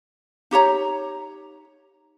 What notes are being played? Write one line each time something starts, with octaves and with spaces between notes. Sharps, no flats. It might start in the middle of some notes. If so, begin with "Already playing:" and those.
D#4 G4 C#5 A#5